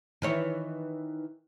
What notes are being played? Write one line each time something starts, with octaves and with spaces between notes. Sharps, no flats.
D#3 E3 C#5